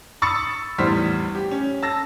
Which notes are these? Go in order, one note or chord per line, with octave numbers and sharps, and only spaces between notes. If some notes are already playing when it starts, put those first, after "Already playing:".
B5 C#6 D#6 E6 A6 C#7
E2 A2 G3 C5 F6 B6
G4
C#4
A5 E6 A#6